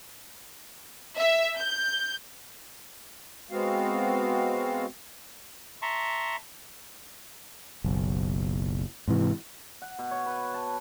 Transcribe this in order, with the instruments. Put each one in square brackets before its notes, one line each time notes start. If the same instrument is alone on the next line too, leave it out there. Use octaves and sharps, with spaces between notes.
[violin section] E5
G6
[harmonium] G#3 B3 C4 F#4 F5
[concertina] E5 A5 A#5 C6 C#6
[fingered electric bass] F#1 B1
G#2 C3 E3
[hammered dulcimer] F#5
B2
C#5
B4
A5